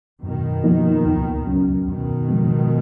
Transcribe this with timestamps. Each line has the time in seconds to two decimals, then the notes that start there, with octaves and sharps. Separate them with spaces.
0.23 F#2 B2 D#3
0.64 F3 A#3 D#4
1.06 C#2
1.46 C#3 F#3 C#4
1.87 F#2 B2 D#3
2.29 C#3 F3 G#3 B3